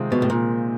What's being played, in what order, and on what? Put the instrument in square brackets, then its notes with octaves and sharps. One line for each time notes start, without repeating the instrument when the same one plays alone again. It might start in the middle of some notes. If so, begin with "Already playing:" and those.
Already playing: [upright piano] C3 D#3 G#3 C4 F4
[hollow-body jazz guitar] B2
A2
A#2